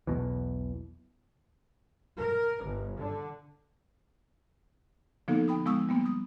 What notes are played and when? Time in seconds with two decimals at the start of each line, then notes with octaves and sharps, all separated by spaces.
0.07 B1 E2 B2 E3
2.19 A#4
2.64 G1
2.99 D3
5.28 D3 F3 A#3 B3 D#4 A4
5.48 G5 B5 D#6
5.66 F3 G#3 B3 C#6 D#6 E6
5.89 G3 A#3 B3
6.06 D#6